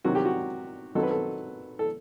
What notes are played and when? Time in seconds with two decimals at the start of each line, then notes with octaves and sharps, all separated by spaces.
0.05 C3 D#3 F#3 C4 F#4
0.15 G4
0.25 F#4
0.95 D#3 F#3 C4 D#4 A4
1.03 B4
1.11 A4
1.79 A4